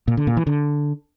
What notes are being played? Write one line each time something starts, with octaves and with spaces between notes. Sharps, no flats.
A#2
D3
A#2
E3
D3